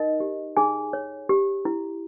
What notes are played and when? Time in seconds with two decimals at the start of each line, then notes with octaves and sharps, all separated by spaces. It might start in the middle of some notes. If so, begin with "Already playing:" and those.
Already playing: D#4 A#4 D#5
0.20 G4
0.57 D#4 G#4 G#5
0.93 C#5
1.29 G4
1.65 E4